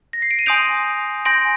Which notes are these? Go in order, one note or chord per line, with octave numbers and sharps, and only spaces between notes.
A#6
C7
D7
D#7
G#5 C6 D#6 G6 D7 F7
G#5 C6 G6 A#6 D7